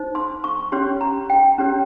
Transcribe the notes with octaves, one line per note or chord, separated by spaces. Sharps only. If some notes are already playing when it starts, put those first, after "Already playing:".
Already playing: D#4 C5
C6
C#6
C#4 G4 C#5 C6
A#5
G5
C#4 G4 C#5